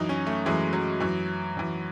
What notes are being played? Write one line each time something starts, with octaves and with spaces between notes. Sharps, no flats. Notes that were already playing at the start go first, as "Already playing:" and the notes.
Already playing: F#2 E3 D#4
C#4
A3
F#2 E3 G#3
F#3
F#2 E3
F#2 E3